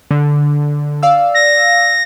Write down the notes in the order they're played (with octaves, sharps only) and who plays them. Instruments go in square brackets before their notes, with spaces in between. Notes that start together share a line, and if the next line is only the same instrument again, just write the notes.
[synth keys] D3
D5 F5 E6
[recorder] A#6